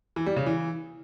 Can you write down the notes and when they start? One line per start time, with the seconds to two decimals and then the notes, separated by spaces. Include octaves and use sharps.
0.16 E3
0.26 G3
0.36 C#3
0.46 E3